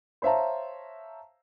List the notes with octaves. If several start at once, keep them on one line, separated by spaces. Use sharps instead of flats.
C5 C#5 E5 F5 A5 A#5